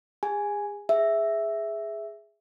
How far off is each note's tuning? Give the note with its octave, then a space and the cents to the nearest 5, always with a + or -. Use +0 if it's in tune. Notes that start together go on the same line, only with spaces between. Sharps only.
G#4 -35 G#5 +0
G#4 +0 E5 +0